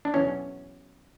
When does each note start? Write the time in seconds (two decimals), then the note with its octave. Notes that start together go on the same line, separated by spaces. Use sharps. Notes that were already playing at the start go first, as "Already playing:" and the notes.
0.05 D4
0.14 E2 B2 F#3 C#4